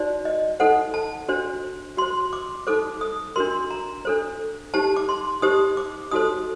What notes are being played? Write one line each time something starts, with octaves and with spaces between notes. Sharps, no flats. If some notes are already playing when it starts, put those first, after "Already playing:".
Already playing: D#4 F#4 C5 D5
D#5
D#4 A4 C5 F#5
A5
D4 F#4 C5
F#4 C5 C6
D6
D#4 A4 C5 D6
D#6
D4 F#4 A#4 C6
A#5
D4 A4 C5
D#4 G4 C5 A5
D6
C6
D#4 G4 C5 D#6
D6
D#4 F#4 A4 C5 D#6